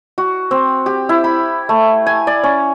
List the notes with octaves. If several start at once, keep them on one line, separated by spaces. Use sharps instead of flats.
F#4
C4
G4
E4
B5
A3
G#5
D5
C#4